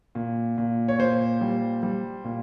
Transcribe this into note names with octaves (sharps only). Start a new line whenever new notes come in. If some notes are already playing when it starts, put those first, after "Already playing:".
A#2
A#2
C#5
A#2 C5
G3
G3
A#2